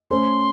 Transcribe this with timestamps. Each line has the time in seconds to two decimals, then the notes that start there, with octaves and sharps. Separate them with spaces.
0.11 A3 C#4 A4 C5 C6